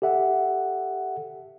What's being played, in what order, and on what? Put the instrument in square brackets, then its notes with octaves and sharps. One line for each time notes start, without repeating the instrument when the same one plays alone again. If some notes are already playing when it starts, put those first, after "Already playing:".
[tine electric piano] G4 A4 E5 F#5